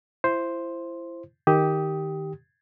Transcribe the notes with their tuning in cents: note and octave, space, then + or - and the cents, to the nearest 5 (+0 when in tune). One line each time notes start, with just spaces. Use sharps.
E4 +30 C5 +0
D#3 +0 G4 +0 D#6 +20